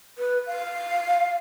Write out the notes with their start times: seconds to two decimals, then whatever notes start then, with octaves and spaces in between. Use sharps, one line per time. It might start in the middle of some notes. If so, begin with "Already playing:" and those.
0.18 B4
0.47 F5